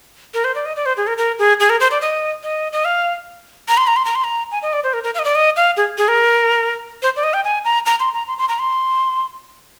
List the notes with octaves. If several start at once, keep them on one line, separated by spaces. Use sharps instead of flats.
A#4
C5
D5
D#5
D5
C5
G#4
A#4
A#4
G#4
G#4
A#4
C5
D5
D#5
D#5
D#5
F5
A#5
C6
A#5
C6
A#5
C6
A#5
G#5
D#5
D5
C5
A#4
A#4
F5
D#5
D5
D#5
F5
G#4
G#4
A#4
C5
D5
D#5
G5
G#5
A#5
A#5
C6
A#5
C6
C6
A#5
C6